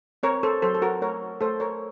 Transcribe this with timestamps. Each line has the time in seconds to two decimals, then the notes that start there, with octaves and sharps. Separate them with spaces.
0.23 C4 A#4 C#5
0.43 A4 C5
0.62 F#3 A4 C5
0.75 A4
0.82 F#4 A#4
1.01 A3 A#4 C#5
1.41 A3 A4 C5
1.60 A#4 C#5